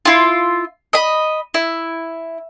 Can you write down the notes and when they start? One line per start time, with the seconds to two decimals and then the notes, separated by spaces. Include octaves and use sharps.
0.05 E4 F4
0.93 D#5 B5
1.54 E4